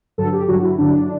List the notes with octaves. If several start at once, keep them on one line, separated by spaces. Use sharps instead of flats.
G2 D3 F#3 A4
G4
G2 D3 F#3 F#4
F#4
E4
G2 D3 F#3 D4